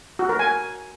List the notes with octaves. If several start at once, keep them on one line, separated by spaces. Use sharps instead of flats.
F#4
A#4
G#5